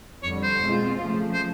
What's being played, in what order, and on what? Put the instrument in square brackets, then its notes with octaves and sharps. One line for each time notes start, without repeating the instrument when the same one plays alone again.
[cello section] F2 D3 G3 [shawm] C#5
[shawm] C5
[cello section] B2 G#3 C4 F4
C#3 F3 A3
[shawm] C5